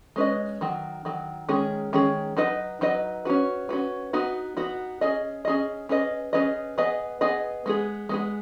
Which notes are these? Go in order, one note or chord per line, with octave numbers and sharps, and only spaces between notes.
G#3 C#4 B4 D#5
D#3 F#3
D#3 F#3
D#3 G#3 C#4 G#4
D#3 G#3 C#4 G#4
F#3 D#4 B4 D#5
F#3 D#4 B4 D#5
C#4 F#4 B4
C#4 F#4 B4
B3 D#4 F#4
B3 D#4 F#4
C#4 G#4 D#5
C#4 G#4 D#5
C#4 G#4 B4 D#5
C#4 G#4 B4 D#5
B3 G#4 B4 D#5
B3 G#4 B4 D#5
G#3 B3 G#4
G#3 B3 G#4